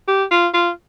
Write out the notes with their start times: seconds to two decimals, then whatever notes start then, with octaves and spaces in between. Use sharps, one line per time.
0.08 G4
0.31 F4
0.54 F4